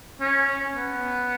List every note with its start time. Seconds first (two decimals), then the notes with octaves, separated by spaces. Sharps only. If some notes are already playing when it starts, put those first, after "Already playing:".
0.20 C#4
0.75 B3